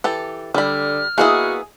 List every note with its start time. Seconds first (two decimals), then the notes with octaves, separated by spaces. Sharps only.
0.04 E3 G4 A4
0.54 D3 G3 B5 F6
1.18 A#3 B3 E4 F#4 G#4 D#5